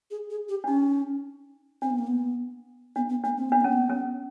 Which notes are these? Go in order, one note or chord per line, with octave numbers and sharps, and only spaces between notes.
G#4
G#4
G4
D4
C#4 D#4
C4 D4
B3
A#3
B3
B3 D4
B3
A#3 D4
C4
B3 D4
A#3 C#4
B3
C#4